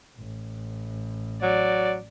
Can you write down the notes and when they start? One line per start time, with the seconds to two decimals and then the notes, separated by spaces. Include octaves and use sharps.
0.18 A1
1.42 F#3 D5